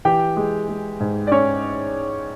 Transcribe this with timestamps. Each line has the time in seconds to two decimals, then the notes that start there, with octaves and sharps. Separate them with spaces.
0.05 E3 G4 G5
0.37 G#3
0.68 G#3
1.00 G#2
1.27 D5
1.32 C#4 C#5